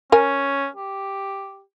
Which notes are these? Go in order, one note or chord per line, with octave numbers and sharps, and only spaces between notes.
C#4 A#4 G#5
G4